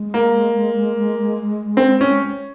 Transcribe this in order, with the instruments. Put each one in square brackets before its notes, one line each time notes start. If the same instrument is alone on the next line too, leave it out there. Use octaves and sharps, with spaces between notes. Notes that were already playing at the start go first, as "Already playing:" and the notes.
Already playing: [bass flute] G#3
[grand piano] A#3
C4
C#4